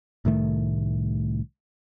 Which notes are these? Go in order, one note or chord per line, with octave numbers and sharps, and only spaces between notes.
C2 A2 D#3 A3